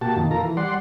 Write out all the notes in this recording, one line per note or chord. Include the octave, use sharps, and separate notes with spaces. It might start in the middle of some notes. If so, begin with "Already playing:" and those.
A#2 F#4 G4 A5
F2 A#2 D#3
F4 A4 A#4 A#5
E3
G3 D5 F#5 C6